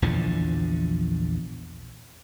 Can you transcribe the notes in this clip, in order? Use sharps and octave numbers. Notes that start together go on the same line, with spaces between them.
A#1 E2 D3 F3